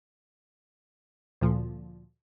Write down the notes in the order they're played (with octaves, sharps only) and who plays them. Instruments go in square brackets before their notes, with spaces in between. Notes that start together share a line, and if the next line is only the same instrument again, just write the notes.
[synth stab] D2 A#2 F3